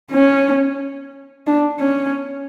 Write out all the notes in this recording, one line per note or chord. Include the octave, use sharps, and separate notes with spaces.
C#4
D4
C#4